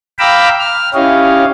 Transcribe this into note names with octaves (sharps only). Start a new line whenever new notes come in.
F5 G5 A#5 B5 D6 E6
F6
C#4 E4 G4 C#5 D#5 F5